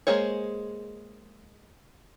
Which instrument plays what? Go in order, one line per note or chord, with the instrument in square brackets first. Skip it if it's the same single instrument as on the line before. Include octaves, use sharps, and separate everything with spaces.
[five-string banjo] G#3 A#3 G#4 C5 C#5